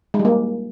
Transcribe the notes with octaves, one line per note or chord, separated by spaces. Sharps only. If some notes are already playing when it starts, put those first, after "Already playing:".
G#3
G3
A#3